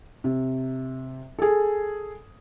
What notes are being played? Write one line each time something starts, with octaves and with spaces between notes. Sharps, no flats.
C3
G#4 A4